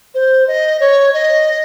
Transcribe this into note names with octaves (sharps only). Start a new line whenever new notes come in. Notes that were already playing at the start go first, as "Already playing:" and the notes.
C5
D#5
C#5
D#5